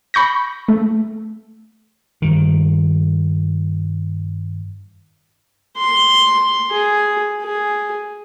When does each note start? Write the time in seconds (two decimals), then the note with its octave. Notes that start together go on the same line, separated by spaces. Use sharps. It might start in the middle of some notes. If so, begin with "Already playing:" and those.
0.14 B5 C#6 G6 A#6
0.68 A3
2.22 G2 D#3
5.78 C6
6.71 G#4
7.42 G#4